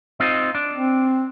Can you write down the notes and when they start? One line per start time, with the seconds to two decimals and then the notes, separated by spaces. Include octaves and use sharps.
0.20 C4 D#4 F4
0.55 D4
0.74 C4